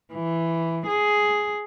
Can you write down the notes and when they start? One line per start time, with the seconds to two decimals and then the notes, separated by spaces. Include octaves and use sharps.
0.13 E3
0.87 G#4